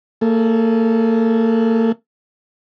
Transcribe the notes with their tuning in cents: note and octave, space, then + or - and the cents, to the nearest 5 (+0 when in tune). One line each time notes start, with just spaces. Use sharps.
A#3 -40 A4 -25